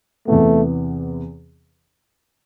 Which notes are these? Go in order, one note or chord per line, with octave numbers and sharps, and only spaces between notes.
E2 C3 E3 A3 B3